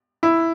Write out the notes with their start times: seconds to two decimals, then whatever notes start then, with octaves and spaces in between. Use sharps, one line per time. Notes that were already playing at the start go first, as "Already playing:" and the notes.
0.23 E4